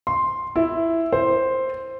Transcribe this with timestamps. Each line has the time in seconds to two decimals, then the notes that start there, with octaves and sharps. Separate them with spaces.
0.07 C6
0.56 E4
1.13 C5